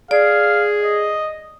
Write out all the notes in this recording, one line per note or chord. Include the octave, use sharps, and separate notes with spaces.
G#4 D5 F5
D#5